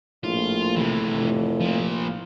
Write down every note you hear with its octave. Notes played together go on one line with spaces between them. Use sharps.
A#1 A2 F4
C3 E3
F1
A#2 F3